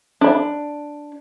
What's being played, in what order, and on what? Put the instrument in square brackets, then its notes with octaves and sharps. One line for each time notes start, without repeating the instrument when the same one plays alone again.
[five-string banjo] D4 B5